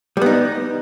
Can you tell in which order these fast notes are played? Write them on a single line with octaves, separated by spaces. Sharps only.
G3 B3 D#4